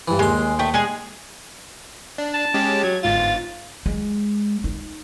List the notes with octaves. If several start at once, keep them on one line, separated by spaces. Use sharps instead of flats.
G2 E3
D#2 G#3 C6
A3 G5
G#3 G#4
D4
A5
G#3 C#4 G4
F#3 G#6
G1 G#2 F4 A6
G#3
D#4